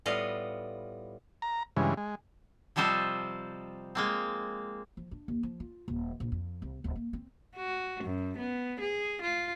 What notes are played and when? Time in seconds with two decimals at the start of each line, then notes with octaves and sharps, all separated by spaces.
0.06 A2 G3 B3 F4 D#5 F5
1.42 A#5
1.77 G2 C#3 E3 G#3
1.97 G#3
2.76 C3 F3 G3 A4 C5 D#5
3.95 G#3 A#3 C4
4.97 F3
5.11 D4
5.28 D#2
5.43 F3
5.60 F4
5.88 D#1
6.20 A#1
6.32 F2
6.62 C2
6.84 D1
6.96 A#3
7.13 C4
7.56 F#4
8.04 F#2
8.38 B3
8.80 G#4
9.22 F4